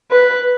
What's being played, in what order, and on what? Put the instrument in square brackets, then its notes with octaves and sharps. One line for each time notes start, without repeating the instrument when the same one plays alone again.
[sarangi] B4